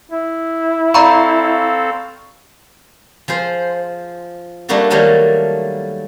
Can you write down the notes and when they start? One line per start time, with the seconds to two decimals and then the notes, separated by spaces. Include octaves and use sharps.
0.11 E4
0.94 C4 A4 D5 F5 A#5 B5 C#6
3.28 F3 G#4 C5
4.69 G3 A3 A#3 D4 F#4 A4
4.90 D#3 F#3 G3 A3 A#3